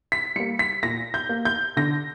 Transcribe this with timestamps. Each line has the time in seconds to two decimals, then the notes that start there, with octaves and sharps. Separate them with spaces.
0.12 B6
0.36 G3 A#3 C#7
0.59 B6
0.83 A#2 A#6
1.14 G6
1.29 A#3
1.45 G6
1.77 D3 A#6